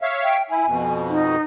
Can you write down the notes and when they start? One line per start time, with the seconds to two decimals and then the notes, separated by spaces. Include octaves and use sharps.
0.02 C#5 E5 F5
0.24 G5
0.50 E4 G#5
0.66 F2 B2
1.08 D#4